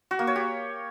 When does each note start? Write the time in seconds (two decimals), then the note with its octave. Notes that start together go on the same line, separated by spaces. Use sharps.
0.11 F#4
0.19 A#3
0.27 C#5
0.36 G4